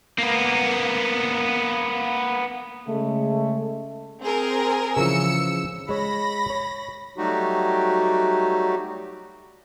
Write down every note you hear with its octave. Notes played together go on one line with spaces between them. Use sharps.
A#3 B3
C#3 G#3 A3
C4 G#4 A#4
C#3 E3 F3 E6 C#7
G#3 C#5 B5 A#6
C#5
F#3 G3 A3 D#4 F#4 G4